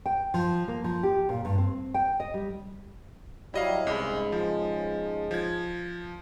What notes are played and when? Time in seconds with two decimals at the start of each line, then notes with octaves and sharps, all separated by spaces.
0.06 G5
0.34 F3
0.68 A#3
0.84 F3
1.03 G4
1.29 A#2
1.45 G2
1.58 C4
1.94 G5
2.20 D#5
2.34 G3
3.54 F#3 G3 E4 D#5 F5
3.87 C2 G#2 C#3 G#3 B5
4.32 F3
5.31 F3 G#6